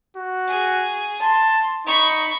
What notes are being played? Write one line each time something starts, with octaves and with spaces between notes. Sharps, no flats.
F#4
G#4
A5 C6
D#4 B5 C#6